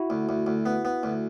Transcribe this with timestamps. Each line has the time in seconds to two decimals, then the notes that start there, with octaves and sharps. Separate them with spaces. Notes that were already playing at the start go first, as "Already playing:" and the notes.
Already playing: E4 F#4
0.10 D2
0.29 D2
0.46 D2
0.66 B3
0.85 B3
1.03 D2